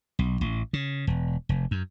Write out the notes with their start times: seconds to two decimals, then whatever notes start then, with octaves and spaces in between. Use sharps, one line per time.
0.19 B1
0.41 A1
0.73 C#3
1.07 E1
1.49 F1
1.71 F#2